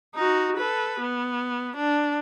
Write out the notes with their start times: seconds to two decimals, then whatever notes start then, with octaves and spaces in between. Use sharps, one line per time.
0.15 D#4 F#4
0.57 A4 B4
1.00 B3
1.76 D4